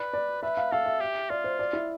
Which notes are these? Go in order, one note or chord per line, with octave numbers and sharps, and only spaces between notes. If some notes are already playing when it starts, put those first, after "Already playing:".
Already playing: B4 D5
D5
B4 E5
F5
A4 F5
E5
G4
F4 D5
C5
D5
E4